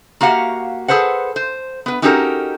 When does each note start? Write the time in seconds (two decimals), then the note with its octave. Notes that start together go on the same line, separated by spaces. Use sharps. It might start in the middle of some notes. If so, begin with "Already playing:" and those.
0.21 A#3 F#4 G4 F5 F#5
0.88 G#4 A4 B4 C5 F#5
1.36 C5
1.86 B3 B4
2.02 C#4 D#4 F#4 G4 A4 A#4